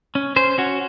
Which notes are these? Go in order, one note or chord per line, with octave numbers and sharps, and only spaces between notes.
C#4
C#4 C5
C#4 F#4